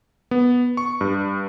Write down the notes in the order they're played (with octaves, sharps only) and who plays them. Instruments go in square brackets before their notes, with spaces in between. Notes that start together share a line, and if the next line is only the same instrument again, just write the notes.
[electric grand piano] B3
C#6
G2